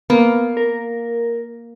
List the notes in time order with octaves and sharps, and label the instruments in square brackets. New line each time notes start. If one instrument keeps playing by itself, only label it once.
[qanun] A#3 [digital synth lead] B3
[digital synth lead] A#4